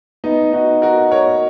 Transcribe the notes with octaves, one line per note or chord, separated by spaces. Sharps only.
B3 D#4
D#4 F#4
F#4 A#4
A#4 C#5